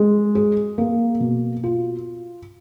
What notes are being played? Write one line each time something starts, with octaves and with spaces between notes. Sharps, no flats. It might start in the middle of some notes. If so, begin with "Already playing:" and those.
Already playing: G#3
G#4
A#3
B2
F4